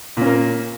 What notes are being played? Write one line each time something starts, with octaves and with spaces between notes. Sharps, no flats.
A#2 A#3 C#4